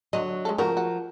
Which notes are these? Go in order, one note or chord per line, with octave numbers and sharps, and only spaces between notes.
D3 F#3 B3 D#5
G#3 C#4 A4
C#3 F3 F#4 A#4
F#4